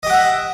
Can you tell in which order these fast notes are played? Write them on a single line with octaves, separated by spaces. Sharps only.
D#5 G4 F#5 E5